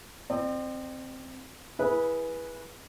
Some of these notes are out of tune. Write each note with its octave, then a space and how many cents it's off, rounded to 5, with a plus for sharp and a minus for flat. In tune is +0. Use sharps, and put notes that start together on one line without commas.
C4 +0 D5 +45
E4 +5 G#4 +0 B4 -20